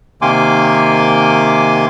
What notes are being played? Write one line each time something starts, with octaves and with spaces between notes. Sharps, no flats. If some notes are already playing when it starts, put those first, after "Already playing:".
C3 D#3 A#3 G#5 C6 D6